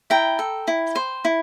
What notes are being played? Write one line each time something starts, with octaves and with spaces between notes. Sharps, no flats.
E4 G5 A#5
A4
E4
C5
E4